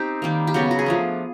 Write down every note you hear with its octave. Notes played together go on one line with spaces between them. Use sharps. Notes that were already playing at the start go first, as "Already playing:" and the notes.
Already playing: C4 D#4 G4 C5
D#3 G3 A#3
G4
C#3 F#3 B3 F#4
F#4
G#4
F3 A3 D4